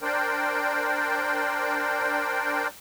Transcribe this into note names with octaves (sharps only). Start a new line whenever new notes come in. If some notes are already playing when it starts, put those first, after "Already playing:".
D4 A#4 C5 D5 G5